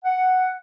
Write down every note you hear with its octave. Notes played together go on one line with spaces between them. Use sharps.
F#5